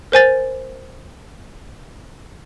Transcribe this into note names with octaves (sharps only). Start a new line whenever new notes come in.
A#4 C5 G#5 A6